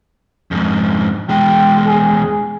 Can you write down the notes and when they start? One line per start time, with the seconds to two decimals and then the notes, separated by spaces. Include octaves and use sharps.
0.51 F2 G#2
1.29 E2 G#3 G5
1.86 G#4